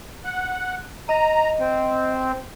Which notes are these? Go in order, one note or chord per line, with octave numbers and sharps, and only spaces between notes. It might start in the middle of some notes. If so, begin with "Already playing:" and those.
F#5
D#5 A#5
C4